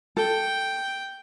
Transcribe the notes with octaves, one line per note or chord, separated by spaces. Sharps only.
A4 G5